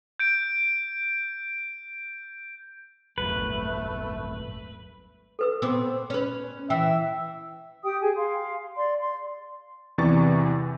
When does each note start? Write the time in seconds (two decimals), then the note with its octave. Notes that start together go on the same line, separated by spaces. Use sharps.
0.19 G6 D7
3.18 D#1 G#1 F#2 A3 B4
5.39 A4 B4 E6
5.62 B3 C4 C5 D6 E6
6.10 C#4 B4
6.70 E3 E5 G5
7.84 G4 G5 D#6
8.01 G#4 G#5
8.16 F5 C6
8.77 D5 C6
8.99 C6
9.98 E2 C3 E3 D5 C#6 A6